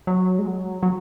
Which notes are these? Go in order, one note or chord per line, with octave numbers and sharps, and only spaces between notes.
F#3
G#3
F#3
F#3